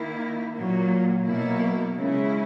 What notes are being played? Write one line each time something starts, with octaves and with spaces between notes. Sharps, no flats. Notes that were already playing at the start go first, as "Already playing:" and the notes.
Already playing: D#3 A#3 E4
A#2 F#3 A#3
B2 F#3 A#3 E4
C#3 G#3 C#4 E4